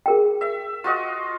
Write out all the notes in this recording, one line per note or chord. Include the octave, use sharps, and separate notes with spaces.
G#4 A#4 G5
E5
F4 F#4 D#5